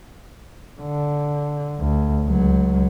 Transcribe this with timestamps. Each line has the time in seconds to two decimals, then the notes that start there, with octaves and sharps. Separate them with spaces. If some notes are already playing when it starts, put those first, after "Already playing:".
0.80 D3
1.79 D2
2.26 C#2 F#3